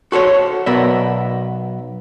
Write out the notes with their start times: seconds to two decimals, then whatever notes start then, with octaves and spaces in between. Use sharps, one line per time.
0.12 F#4 A4 C5 C#5
0.66 B1 B2 B3 A#4 D5 E5